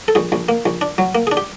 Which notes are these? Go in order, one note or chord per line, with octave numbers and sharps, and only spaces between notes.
A4
A#1 G#4
A#1
A#3
A#1
D4
F#3
A#3
D4 G#4
G4